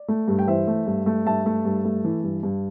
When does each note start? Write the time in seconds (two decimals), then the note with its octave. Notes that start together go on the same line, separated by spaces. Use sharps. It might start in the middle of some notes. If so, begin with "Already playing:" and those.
Already playing: D5
0.08 A3
0.28 G2
0.39 G5
0.47 E3 C5 E5
0.67 A3
0.86 G2
1.06 A3
1.26 G2 E5 A5
1.46 A3
1.65 G2
1.85 A3
2.05 E3
2.23 G2
2.43 G2